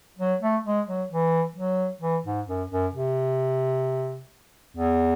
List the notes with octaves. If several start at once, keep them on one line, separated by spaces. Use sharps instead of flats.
F#3
A3
G#3
F#3
E3
F#3
E3
G#2
F#2
F#2
C3
E2